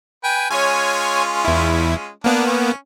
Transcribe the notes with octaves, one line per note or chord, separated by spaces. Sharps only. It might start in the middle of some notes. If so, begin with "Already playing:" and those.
B4 G5 G#5
G#3 C#4 F4 C#5 G#5
E2 E4
A#3 B3 D4
C#4